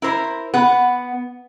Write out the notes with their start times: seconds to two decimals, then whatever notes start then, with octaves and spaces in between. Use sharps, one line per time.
0.02 E4 A#4 C5
0.54 B3 F#5